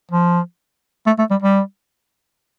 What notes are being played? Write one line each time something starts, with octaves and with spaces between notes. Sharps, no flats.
F3
A3
A3
G3
G3